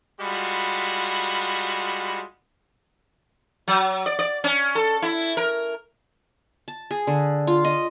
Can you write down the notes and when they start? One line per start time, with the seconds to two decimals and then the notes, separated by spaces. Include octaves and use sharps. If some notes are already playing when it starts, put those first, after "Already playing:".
0.21 G3 G#3 F4 F#4 B5
3.68 F#3
4.06 D5
4.19 D5
4.44 C#4
4.75 A4
5.02 E4
5.37 A#4
6.68 A5
6.91 G#4
7.07 D3
7.47 F4
7.65 D#5